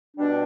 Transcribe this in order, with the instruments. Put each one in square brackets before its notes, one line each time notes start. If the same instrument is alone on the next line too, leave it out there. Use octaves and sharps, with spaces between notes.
[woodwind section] B2 G3 D4